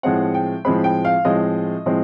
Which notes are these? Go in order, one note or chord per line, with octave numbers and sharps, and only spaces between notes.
A2 F3 G#3 C4 F#5
G5
A2 F3 G#3 C4 B5
G5
F5
A2 F3 G#3 C4 D#5
A2 F3 G#3 C4